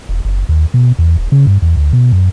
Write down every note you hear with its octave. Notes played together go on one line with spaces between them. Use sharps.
E1
F#1
D#2
B2
E2
D#1
C#3
G2
E2
D2
B2
F#2